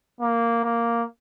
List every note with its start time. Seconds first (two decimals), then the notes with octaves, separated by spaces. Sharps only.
0.21 A#3
0.64 A#3